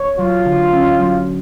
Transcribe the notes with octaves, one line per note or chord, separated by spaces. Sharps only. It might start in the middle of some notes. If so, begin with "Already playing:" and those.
Already playing: C#5
F#3 F4
D3
C#4
F#3